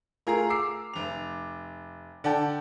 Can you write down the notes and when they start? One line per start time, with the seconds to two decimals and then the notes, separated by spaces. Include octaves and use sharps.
0.27 A3 F4 G#4 A#4 A#5
0.50 D6 E6 C7
0.94 F1 F7
2.24 D3 D5 F#5 G5 A5